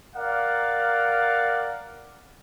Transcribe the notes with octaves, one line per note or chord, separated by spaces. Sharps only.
A#4 D5 F5 F#5